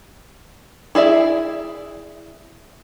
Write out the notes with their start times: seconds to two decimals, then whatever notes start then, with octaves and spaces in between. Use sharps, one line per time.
0.95 E4 G#4 D5 E5